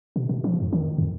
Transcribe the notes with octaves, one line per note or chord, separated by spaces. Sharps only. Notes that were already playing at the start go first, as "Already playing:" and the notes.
B2
B2
F3
F2
D#3
F2